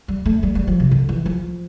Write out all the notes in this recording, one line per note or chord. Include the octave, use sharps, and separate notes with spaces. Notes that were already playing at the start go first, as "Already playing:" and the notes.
G3
A3
G3
G3
F3
C3
D3
E3
F3